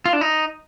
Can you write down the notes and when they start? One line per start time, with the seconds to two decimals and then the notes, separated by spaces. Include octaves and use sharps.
0.05 F4
0.13 D4
0.21 D#4